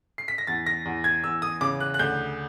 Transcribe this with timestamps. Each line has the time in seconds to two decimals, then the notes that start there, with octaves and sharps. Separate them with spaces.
0.18 C7
0.28 B6
0.38 A#6
0.47 E2 A6
0.66 A#6
0.86 E2
1.04 G#6
1.24 E2 E6
1.42 D#6
1.61 C#3 D6
1.80 F#6
1.94 F#6
1.99 D2 G6